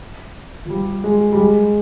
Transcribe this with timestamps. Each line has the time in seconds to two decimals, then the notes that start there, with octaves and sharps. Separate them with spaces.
0.66 F3
0.70 G3
1.04 G#3
1.32 G3
1.37 G#3